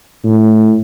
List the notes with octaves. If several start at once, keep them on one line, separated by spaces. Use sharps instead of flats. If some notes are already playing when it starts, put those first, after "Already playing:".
A2